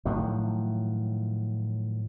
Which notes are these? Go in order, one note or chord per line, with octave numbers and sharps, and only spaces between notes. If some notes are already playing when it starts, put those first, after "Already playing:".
A2 D#3 F3 F#3